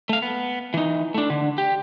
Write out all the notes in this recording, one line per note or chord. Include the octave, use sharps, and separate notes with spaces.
A3 F5
B3
E3 D#4
A3 D4
D3
G4